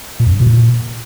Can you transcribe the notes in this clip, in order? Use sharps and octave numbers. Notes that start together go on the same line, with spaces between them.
A#2
F2
G2
B2
A#2